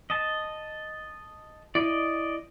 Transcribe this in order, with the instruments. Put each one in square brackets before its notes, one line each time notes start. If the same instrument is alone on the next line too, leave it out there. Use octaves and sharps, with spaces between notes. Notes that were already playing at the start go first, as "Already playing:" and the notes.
[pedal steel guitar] D#5 A5
[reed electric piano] E4 [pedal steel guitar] D5 D#5